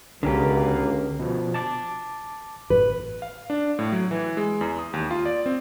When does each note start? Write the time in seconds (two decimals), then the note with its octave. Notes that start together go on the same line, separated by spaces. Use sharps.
0.23 C#2 B2 D3 A#3 C#4 G4
1.19 B2 F3
1.54 A5 D6
2.70 A1 B4
3.22 F5
3.50 D4
3.79 A2
3.92 F#3
4.11 E3
4.37 G#3
4.61 E2
4.79 D#6
4.93 D#2
5.11 F4
5.25 D5
5.46 C4